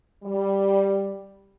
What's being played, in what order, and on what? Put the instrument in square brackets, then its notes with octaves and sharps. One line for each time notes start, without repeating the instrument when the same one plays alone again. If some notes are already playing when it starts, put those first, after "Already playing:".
[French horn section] G3